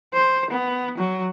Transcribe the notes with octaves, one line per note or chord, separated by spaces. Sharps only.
C5
B3
F#3